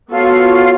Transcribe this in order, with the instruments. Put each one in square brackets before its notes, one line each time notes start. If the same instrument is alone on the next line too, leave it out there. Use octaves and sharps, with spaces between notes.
[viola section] B3 F#4 A4 C#5 [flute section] F4